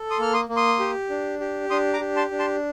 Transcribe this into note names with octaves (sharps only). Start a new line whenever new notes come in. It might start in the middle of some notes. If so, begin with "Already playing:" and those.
Already playing: A4
C6 D#6
A#3 F6
C6 D#6
A#3
C6 D#6
G4
D4
G4
D4 C6 D#6
A#5 D6
G4
A5 C6
D4
A5 C6